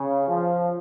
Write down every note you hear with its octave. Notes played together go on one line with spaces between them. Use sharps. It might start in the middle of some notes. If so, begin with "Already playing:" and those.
Already playing: C#3
F3